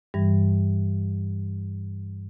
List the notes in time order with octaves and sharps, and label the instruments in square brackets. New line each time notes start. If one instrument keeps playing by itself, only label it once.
[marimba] G2 E3 G3